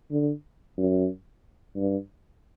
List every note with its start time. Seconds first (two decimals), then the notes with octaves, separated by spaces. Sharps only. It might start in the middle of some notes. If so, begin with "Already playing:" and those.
0.11 D3
0.77 F#2
1.76 G2